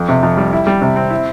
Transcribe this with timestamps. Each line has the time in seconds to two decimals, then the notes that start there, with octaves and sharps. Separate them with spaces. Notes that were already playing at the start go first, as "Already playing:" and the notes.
Already playing: F2
0.09 C3
0.23 F2
0.37 G3
0.53 E4
0.67 G3
0.81 C3
0.96 C4
1.10 E4